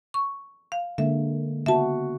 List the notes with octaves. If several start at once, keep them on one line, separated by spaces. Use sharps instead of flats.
C#6
F5
D3 G#3 A#3 E5
C#3 B3 F#4 E5 A5